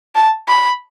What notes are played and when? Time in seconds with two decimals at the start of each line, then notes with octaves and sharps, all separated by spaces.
0.16 A5
0.48 B5